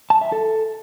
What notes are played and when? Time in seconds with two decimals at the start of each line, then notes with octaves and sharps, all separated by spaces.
0.10 A5
0.21 E5
0.32 A4